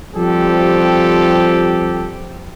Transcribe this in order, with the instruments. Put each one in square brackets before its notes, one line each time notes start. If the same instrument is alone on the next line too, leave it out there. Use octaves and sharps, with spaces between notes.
[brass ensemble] F3 G3 C4 G4 A4